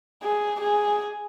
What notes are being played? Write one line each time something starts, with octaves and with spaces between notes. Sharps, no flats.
G#4
G#4